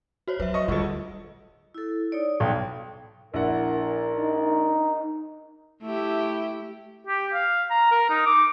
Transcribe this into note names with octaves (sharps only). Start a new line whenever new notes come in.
F#4 C5 C#5
F#3 B4 E5
D#5 C#6
D2 D#3 G3 F4 A4 D#5
E4 A4
D#4 C#5 D5
B1 D5 G5
A#1 E4 A#4 F#5
D#4
A3 E4 G4
G4
F5
A#5
A#4
D#4
D6